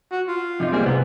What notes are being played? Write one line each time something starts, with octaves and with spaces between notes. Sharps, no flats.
F#4
F4
F2 C3 D#4
G3 A#3 C4 G#4
G#2 C3 B3